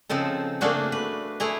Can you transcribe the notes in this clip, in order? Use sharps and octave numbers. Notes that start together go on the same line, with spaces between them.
C#3 F3 C4 D#4 A4
A3 A#3 D4 F#4 G#4
B4
A3 E4 G#4 A#5